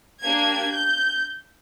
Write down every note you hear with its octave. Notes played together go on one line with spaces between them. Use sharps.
A#3 D4 G4 G#6
G6